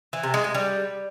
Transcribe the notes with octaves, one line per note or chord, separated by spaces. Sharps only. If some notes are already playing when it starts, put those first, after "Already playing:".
E3
C3
G#3
G#3
G3